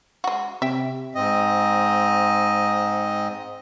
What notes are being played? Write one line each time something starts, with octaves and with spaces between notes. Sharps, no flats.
G#3 F#4
C3 E5 G5
G#2 C4 D#5